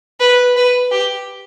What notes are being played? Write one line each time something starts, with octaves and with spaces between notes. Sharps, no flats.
B4
B4
G4